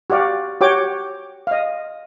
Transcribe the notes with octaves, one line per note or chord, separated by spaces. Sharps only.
F#4 G4 D5 F5
F#4 G4 C#5 G5 D6
D#5 F5